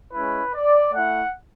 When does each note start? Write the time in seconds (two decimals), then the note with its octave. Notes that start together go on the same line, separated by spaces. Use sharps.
0.13 G#3 C#4 E4 B4
0.53 D5
0.92 A3 E4 F#5